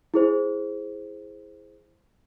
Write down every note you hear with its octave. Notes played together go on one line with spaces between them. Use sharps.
E4 G#4 C5